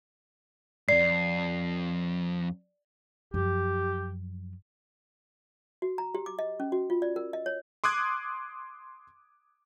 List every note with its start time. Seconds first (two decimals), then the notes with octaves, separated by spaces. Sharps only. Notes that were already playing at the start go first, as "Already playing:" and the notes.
0.89 F2 G#2 D5 C7
3.34 F#2 F3 G4
5.82 F#4
5.98 A#5
6.15 G4
6.26 D6
6.39 D#5
6.60 C#4
6.72 F#4
6.90 F4
7.02 D5
7.16 A#4
7.33 D#5
7.46 C#5
7.84 C6 D6 D#6 F#6 G#6